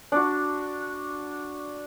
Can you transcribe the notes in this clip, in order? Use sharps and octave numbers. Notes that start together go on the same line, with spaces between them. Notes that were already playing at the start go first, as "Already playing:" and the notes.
D4 F#4